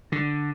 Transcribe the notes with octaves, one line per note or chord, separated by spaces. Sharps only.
D3